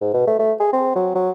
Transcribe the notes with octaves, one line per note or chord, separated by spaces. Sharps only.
G#2
B2
A3
A3
G#4
C4
F#3
F#3